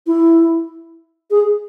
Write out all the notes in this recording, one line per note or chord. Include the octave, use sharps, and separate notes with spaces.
E4
G#4